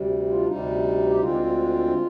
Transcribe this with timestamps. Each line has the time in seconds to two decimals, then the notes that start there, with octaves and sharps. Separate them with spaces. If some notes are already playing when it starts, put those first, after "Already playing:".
Already playing: D2 C3 G3
0.29 F4
0.43 D4
0.47 D2 C3 G3 D#4
1.10 G4
1.20 D2 D3 G#3 C4 F4